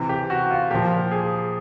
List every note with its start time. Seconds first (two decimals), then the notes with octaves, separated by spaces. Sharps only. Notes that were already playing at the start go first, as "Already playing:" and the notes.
Already playing: C3 E3
0.09 G4
0.30 F#4
0.51 F4
0.71 A#2 F3 G4
1.11 G#4